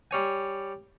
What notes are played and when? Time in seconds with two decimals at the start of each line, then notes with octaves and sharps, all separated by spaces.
0.11 G3 C#5 G#5